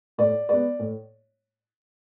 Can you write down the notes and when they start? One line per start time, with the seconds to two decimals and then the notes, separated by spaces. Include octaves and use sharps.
0.18 A2 D5
0.49 G#3 B3 D5
0.79 A2